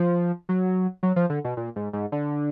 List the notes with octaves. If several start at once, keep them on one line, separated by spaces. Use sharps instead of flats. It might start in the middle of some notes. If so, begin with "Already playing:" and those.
Already playing: F3
F#3
F#3
F3
D3
B2
A#2
G#2
G#2
D3